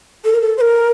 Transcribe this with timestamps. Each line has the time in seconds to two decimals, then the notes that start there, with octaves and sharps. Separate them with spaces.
0.25 A4
0.33 A#4
0.42 A4
0.58 C5
0.61 A#4